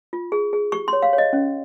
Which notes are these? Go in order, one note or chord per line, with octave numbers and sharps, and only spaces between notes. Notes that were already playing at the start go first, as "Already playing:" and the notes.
F4
G#4
G#4
G4 C#6
C6
C#5
F5
C#5
D#5
C#4